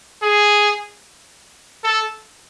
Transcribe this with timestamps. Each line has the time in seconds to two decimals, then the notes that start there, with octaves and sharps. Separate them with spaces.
0.22 G#4
1.84 A4